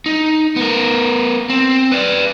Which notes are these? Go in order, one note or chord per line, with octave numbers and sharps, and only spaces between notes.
D#4
B3 A#4
C4
B4 D5